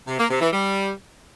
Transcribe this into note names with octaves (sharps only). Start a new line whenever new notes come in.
C3
A#3
C3
E3
G3